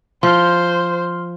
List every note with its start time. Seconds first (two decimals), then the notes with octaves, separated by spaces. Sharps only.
0.23 F3 C5 C6 F6